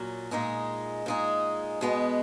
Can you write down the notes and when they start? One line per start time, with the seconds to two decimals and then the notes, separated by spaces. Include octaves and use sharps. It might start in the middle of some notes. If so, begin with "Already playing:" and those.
Already playing: A#2 F#3 C#4
0.31 A#2 G#3 D#4 G#4
1.06 A#2 G#3 D#4 G#4
1.81 B2 G#3 B3